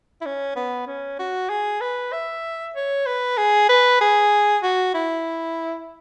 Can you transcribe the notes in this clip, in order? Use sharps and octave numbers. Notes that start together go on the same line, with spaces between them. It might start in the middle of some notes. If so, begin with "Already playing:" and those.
E4
C#4
B3
C#4
F#4
G#4
B4
E5
C#5
B4
G#4
B4
G#4
F#4
E4